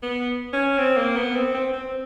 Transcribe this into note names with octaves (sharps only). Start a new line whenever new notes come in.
B3
C#4
C4
A#3
B3
C4
C4
C4